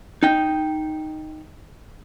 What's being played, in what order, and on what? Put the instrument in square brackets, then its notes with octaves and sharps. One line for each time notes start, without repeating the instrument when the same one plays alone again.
[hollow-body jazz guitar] D#4 G5